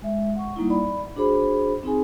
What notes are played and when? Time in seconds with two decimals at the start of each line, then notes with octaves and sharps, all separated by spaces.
0.02 G#3 E5
0.36 F#5 C#6
0.56 G3 A#3 D#4 E4
0.70 D5 B5
1.16 D4 F#4 G#4 C5 B5
1.83 C4 D#4 G#4 G#5